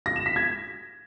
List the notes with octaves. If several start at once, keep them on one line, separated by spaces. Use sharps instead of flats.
A#6
E7
B6
G#6